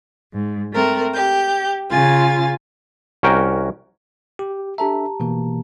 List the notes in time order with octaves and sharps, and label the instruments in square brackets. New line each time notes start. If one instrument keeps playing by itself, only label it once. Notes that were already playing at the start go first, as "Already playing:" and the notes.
[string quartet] G#2
A3 C4 A#4
G4 G6
C#3 F4 G#5 A6
[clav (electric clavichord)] C2 C#4 F#4 A#4 G5 A#5
[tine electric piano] G4
[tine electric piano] D4 A4 E5 [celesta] G4 A5 A#5
[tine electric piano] B2 E3 A#3